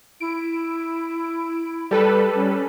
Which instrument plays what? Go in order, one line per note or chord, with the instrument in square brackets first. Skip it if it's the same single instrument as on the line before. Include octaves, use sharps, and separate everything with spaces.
[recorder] E4 [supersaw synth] D7
[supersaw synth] G3 A4 B4
[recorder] C#4